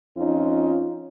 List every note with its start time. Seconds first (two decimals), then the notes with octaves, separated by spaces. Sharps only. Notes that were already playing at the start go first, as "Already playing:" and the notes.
0.17 F2 C#4 D#4 F4